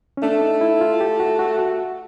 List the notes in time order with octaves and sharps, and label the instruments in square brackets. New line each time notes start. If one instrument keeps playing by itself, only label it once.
[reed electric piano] C#4
[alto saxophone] A3 [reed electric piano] D4
[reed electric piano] D#4
E4
F4
G4
F#4
F#4
F#4